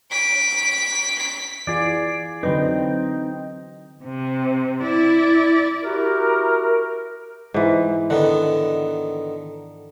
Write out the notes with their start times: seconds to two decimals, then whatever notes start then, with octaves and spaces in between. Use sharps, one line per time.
0.11 B6 D7
1.19 B6
1.67 E3 F4 G#4 D5
2.43 D3 F#3 C4 D#4 B4
4.05 C3
4.83 E4 D5
5.82 E4 F#4 G4 A#4
7.54 G#2 E3
8.10 D3 D#3 B3 F#5